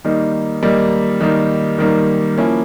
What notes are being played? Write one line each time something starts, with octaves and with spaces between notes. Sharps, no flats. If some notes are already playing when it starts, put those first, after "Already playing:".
D#3 G3 A#3 D#4
D#3 G3 A#3 D#4
D#3 G3 A#3 D#4
D#3 G3 A#3 D#4
F3 A#3 C#4 E4